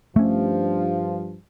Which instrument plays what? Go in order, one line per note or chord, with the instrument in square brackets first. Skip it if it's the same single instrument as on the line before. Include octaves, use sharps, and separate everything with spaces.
[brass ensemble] G2 F3 [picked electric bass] A3 C#4